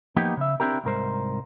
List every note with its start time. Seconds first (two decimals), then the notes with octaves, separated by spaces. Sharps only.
0.16 F3 A#3 B3 D#4 G4
0.37 C#3 E5
0.60 C4 D4 E4 G4 A#4
0.84 C2 G#2 A#4 C5